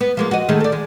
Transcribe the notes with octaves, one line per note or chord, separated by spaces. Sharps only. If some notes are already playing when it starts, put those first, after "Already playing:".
B3
F3 G#3 A#3
F#4 D#5
D#3 A3 G#4
A4 D5
G#3